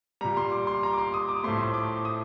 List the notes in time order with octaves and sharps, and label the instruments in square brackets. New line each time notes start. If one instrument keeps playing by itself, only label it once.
[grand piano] A#2 G3 A#5
C6
D6
C6
A#5
D6
C6
D#6
D6
A2 F3 A3 C6
D6
D#6